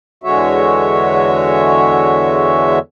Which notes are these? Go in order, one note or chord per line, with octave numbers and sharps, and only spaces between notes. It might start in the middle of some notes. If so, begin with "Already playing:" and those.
E2 D3 G#3 F#4 C#5 E5